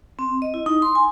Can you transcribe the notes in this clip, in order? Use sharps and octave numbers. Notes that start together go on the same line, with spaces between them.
C4
D#5
E4
D#4
C6
G#5